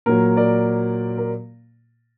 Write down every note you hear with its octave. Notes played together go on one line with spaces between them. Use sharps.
A#2 F#3 A#4
A#4 D5
A#4